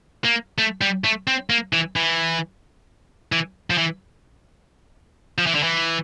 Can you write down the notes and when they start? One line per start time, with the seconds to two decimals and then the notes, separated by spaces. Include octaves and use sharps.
0.24 A#3
0.58 A3
0.81 G3
1.04 A3
1.27 C4
1.50 A#3
1.73 E3
1.96 E3
3.32 E3
3.70 F3
3.78 E3
5.38 F3
5.47 E3
5.55 D3
5.63 E3